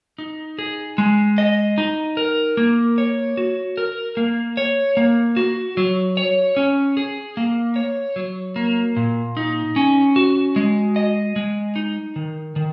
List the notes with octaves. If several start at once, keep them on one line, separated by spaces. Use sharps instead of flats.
D#4
G#4
G#3
D#5
D#4
A#4
A#3
C#5
F#4
A#4
A#3
C#5
A#3
F#4
F#3
C#5
C#4
G#4
A#3
C#5
F#3
A#3
A#2
D#4
C#4
F#4
G#3
D#5
G#3
D#4
D#3
D#3